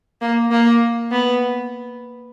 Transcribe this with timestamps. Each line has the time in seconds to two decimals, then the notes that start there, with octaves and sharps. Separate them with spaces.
0.21 A#3
0.51 A#3
1.11 B3